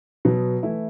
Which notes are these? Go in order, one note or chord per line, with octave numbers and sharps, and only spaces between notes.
B2 F#3 B3
E3 A3 E4